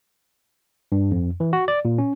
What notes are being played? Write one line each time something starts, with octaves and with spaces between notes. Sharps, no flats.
G2
F2
E3
F#4
D5
A#2
C#4